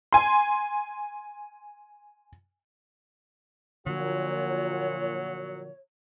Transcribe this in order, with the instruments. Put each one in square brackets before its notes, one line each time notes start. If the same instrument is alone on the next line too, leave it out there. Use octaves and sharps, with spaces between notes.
[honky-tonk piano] G#5 C6
[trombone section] A#2 F#4 [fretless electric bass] D3 F3 [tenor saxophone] F#3 [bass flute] C#5